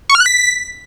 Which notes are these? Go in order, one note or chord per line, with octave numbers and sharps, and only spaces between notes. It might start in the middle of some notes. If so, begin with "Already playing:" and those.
C#6
F6
F#6
B6